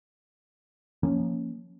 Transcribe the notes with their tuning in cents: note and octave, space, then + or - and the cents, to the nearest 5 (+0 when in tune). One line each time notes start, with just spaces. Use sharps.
F3 +0 A#3 +0 C#4 +0